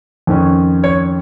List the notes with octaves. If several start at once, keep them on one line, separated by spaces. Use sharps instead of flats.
F2 D#3 C#4
C#5